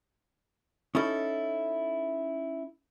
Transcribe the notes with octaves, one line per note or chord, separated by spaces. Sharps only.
C#4 D#4 E4 A4